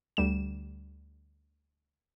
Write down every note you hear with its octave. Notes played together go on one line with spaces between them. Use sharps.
D2 G3 E7